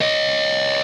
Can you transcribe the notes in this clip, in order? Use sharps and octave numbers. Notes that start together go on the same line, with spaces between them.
C#5 D#5